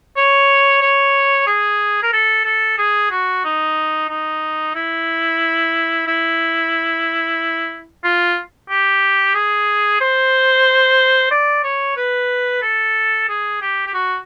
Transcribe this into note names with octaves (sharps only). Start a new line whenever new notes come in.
C#5
C#5
G#4
A#4
A4
A4
G#4
F#4
D#4
D#4
E4
E4
F4
G4
G#4
C5
D5
C#5
B4
A4
G#4
G4
G4
F#4